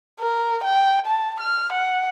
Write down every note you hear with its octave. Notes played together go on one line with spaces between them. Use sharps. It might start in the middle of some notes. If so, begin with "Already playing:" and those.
A#4
G5
A5
F6
F#5